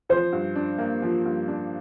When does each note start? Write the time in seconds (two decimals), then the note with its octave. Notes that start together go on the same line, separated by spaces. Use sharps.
0.09 F3 C5
0.32 G2
0.56 D4
0.78 A#3
1.02 F3
1.25 G2
1.48 D4